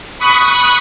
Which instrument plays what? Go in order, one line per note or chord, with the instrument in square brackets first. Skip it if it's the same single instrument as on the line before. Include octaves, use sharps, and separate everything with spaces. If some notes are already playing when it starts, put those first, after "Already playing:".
[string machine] B5 C#6 D#6 F#6 B6